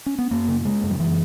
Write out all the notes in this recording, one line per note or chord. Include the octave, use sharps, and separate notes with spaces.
C#4
B3
F#2 A#3
C#3
C#3 G#3
F#2
F#3
F#2 E3